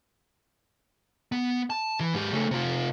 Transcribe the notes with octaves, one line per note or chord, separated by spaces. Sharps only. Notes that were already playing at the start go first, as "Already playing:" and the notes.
B3
A5
E3
G#2 G4
C#3 A3
C3 F4